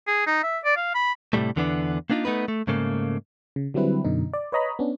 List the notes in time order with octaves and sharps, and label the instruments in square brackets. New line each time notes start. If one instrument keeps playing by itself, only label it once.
[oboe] G#4
D#4
E5
D5
F5
B5
[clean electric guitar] A2 C3 D#3 E3 G3 A3
E2 D3 E3 A#3 B3 D4
A#3 B3 D4 D#4 F4
A3 B3 D#4 B4
A3
G#2 C#3 A3 A#3
[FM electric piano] C#3
D3 F#3 G3 C4 E4 B4
F#2 B2 D3 D#4
D5
B4 C#5 D#5 A#5 B5
B3 C#4 D4